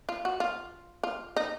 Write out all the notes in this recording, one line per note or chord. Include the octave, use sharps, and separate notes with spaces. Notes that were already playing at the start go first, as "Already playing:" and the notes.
F4
F#4
F4
F4
D#4